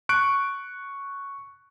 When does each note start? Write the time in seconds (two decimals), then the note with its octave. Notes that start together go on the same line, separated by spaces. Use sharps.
0.09 C#6 F#6 D7